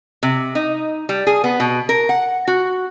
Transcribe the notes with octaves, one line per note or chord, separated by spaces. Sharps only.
C3
D#4
G3
G#4
B3
B2
A#4
F#5
F#4